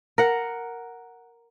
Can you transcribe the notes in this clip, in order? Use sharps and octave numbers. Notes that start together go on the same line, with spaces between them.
A#4 F#5